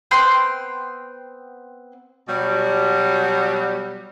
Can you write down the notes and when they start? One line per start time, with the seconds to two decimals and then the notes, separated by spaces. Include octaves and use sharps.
0.11 B3 C4 G5 C6
2.27 B2 F#3 G3